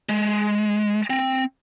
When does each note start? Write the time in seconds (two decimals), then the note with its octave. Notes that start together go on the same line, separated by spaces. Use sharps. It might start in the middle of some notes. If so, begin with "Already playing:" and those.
0.09 G#3
1.10 C4